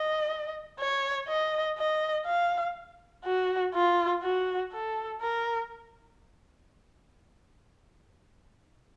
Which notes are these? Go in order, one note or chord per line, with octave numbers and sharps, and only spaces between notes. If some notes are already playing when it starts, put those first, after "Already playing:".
Already playing: D#5
C#5
D#5
D#5
F5
F#4
F4
F#4
A4
A#4